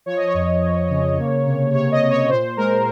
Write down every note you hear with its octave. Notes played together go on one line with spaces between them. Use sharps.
F3 C#5
D#5
C#5
F2
F2
C#3
A#3
C3
C3 C#5
D#5
C3
C#5
A#2 C5
G#3 A#4